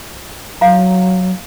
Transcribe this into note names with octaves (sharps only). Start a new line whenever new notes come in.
F#3 F5 A#5